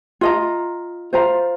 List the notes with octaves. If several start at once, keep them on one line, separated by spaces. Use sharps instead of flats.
F4 D#5 A#5
F4 C5 F5 A#5